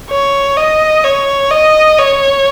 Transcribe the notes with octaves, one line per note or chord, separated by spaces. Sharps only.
C#5
D#5
C#5
D#5
C#5